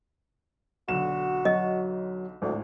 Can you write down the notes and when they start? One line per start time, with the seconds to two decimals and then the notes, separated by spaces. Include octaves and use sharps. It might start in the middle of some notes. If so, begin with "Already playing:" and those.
0.88 B1 D3 F#4 E7
1.45 F#3 D#5
2.42 G#1 D2 A2